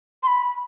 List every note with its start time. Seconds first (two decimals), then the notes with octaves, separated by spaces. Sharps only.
0.23 C6
0.27 B5